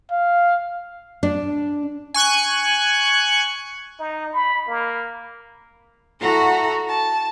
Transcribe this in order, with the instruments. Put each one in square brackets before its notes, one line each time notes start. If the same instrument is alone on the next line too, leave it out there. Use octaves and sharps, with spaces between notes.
[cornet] F5
[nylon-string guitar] D4
[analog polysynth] G#5 C#6 F#6
[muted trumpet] D#4
B5
A#3
[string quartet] E4 F#4 A4 F#5 A#5
A5